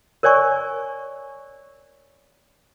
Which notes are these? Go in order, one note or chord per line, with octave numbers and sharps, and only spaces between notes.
A#4 C#5 D5 G#5 C#6